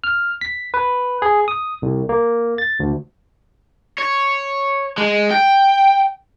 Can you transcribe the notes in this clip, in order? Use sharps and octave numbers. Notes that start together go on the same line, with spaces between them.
F6
B6
B4
G#4
D#6
C2
A#3
A6
D2
C#5
G#3
G5